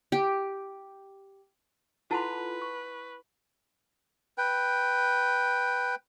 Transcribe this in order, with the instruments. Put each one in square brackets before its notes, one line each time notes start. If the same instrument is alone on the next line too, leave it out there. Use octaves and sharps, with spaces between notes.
[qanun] G4
[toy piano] E4 F#5 A5 [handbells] F4 A4 C6 [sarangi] B4
[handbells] C#6
[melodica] B4 G5